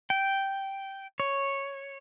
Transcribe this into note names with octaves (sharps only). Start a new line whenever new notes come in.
G5
C#5